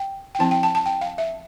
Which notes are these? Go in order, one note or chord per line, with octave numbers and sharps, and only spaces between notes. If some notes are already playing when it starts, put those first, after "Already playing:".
Already playing: G5
G5
F3 C4 E4 A5
G5
A5
A5
G5
F5
E5